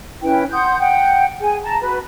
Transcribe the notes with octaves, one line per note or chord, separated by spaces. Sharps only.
C#4 E4 B4 G5
F#5 C6 D#6 G6
F#5 G5
G#4 G#5
A5 A#5
F#4 B4